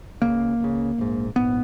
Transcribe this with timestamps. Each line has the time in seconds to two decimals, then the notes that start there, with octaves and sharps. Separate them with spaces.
0.22 C#2 C#3 A#3
0.60 C#2 C#3
0.98 A#1 G#2
1.36 A#1 G#2 B3